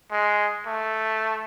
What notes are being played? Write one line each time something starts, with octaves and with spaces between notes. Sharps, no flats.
G#3
A3